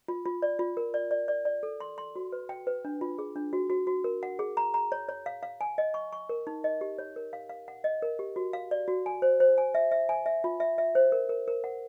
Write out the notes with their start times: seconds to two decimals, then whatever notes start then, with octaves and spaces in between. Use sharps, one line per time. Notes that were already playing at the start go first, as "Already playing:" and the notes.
0.08 F4
0.25 F4
0.42 D5
0.59 F4
0.77 A#4
0.94 D5
1.11 D5
1.28 D5
1.45 D5
1.63 A4
1.80 C6
1.98 C6
2.16 F#4
2.32 B4
2.49 G5
2.67 B4
2.85 D4
3.01 F4
3.19 G#4
3.36 D4
3.53 F#4
3.70 F#4
3.87 F#4
4.04 A#4
4.23 F#5
4.39 G#4
4.57 A#5
4.74 A#5
4.92 C#5
5.09 C#5
5.26 F5
5.43 F5
5.61 G#5
5.78 D#5
5.94 C#6
6.12 C#6
6.29 A#4
6.47 D#4
6.64 D#5
6.81 G4
6.99 C#5
7.16 A#4
7.33 F5
7.49 F5
7.68 F#5
7.84 D#5
8.02 A#4
8.19 G4
8.36 F#4
8.53 F5
8.71 D5
8.88 F#4
9.06 G#5
9.22 C5
9.40 C5
9.58 G#5
9.75 E5
9.92 E5
10.09 G#5
10.26 E5
10.44 F4
10.60 E5
10.78 E5
10.95 C5
11.12 A#4
11.29 A#4
11.48 A#4
11.64 F#5